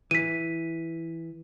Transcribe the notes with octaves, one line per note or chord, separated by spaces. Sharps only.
E3 B6 D#7